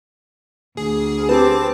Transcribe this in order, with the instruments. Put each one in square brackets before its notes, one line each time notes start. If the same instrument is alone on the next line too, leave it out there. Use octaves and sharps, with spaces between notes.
[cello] D2 [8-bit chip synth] G#4
[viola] C4 [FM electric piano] G4 B4 [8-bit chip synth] A5 D6